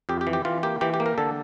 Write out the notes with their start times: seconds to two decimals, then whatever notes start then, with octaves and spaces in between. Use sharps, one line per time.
0.09 F2 G4
0.21 G4
0.27 E3
0.33 G4
0.45 E3 F4
0.63 A#3 G4
0.81 E3 G4
0.94 G4
1.00 A#3
1.06 A#4
1.18 D3 A4